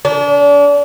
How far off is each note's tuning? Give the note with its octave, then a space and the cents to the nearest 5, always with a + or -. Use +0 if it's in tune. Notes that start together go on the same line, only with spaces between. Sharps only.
D4 -35